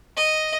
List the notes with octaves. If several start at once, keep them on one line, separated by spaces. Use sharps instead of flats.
D#5